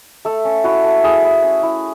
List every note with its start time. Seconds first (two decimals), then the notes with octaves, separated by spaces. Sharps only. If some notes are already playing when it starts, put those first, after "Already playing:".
0.25 A3 A4
0.45 C#4
0.64 E4 F#4
0.84 A3
1.04 E4 G#4
1.24 E4
1.43 C#4
1.63 E4